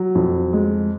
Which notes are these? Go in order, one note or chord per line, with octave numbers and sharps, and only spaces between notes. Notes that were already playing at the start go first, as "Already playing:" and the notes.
Already playing: F#3
F2
G#3